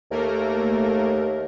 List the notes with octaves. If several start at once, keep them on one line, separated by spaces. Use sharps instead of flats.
D#2 A3 A#3 A#4